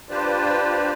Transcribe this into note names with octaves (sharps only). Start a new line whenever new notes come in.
D4 F4 G4 B4 C5 D5